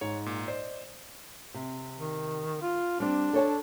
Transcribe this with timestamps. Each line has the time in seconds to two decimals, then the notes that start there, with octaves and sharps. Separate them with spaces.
0.01 G#2 C#5
0.26 A#2
0.48 C5 D5 D#5
1.54 C3
1.99 D#3
2.61 F4
3.00 G3 C4 D4
3.33 A4 C#5 A5